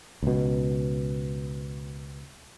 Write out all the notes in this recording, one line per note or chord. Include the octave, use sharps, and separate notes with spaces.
C#2 B2